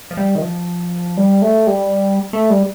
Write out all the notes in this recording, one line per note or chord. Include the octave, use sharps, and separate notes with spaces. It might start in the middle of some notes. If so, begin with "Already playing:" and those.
F3
G3
D#3
F3
G3
A3
G3
A3
G3